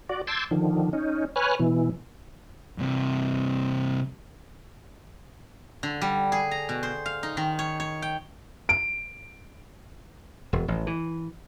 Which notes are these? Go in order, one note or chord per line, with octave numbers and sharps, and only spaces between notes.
F#4 D5
A5 C6 D6 E6 G6 G#6
D3 D#3 F3
C#4 D#4
B4 C#5 G#5 F6 F#6
B2 E3
G2 C3
D3
G3
G#4
A#5
B2
C5
F5
D#4
D#3
C#5
C#5
G5
D7
E1
A1
E3